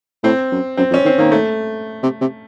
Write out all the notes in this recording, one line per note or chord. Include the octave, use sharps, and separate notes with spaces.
A2 C4
F#2
F#2 C4
F2
C#4
D#3 C4
D#3 A#3
A3
C3
C3